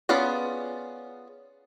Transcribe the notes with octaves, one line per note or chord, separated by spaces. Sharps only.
B3 C#4 F4 G#4 D5